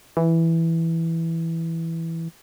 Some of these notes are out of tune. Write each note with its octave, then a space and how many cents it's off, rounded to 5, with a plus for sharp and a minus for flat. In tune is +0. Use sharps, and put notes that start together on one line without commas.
E3 +0